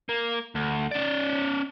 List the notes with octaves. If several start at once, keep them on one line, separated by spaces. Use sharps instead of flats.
A#3
D2
C#4 D5